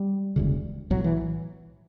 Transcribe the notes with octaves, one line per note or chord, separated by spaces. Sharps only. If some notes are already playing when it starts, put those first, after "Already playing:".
Already playing: G3
E1 D2 C#3
B1 A2 F#3
E3